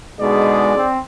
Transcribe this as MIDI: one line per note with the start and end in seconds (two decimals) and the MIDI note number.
0.20 0.75 47
0.20 0.82 50
0.20 0.75 56
0.20 0.82 63
0.20 0.82 68
0.20 0.92 74
0.76 0.98 60